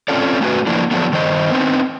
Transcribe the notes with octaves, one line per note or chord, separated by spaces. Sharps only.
C4 C#4 F4 A4 D5
A3 C#4 F#4 B4
F3 A#3 D4 E4
D3 F3 F#3 A3 B3 D4
G2 D#3 C5 D#5
B3 C4 D#4